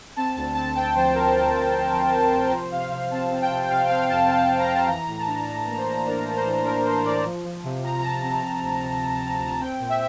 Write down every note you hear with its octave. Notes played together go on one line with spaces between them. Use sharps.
C4 A5
D2 A5
C4 A5
C4 G5
F3 C5
C4 A#4
F3
D2
F3
F3
F3
C3
F3 C5
C3 F5
C3 F5
C4 A5
C4
G5
C3
C3 F5
C4 F5
F2 A5
C4 A5
C3
A#5
F2 A5
E3 A#5
A2
A5
D4
D4
A#3
C5
A#3
D4 A#4
E3
C5
E3
D4 A#4
D4 C5
A2 D5
F3
F3
C3
F3 A#5
A#5
F3 A5
C4
C3
D2
C3
C3
C3
D2
C4 G5
A#2
E5